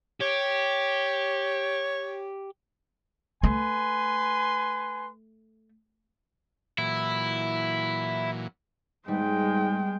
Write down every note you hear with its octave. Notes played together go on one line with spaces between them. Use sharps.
G4 C#5
A3 B4 G#5 C6
A#2 E3 F#3 E4
G#2 G3 G#3 B3 G5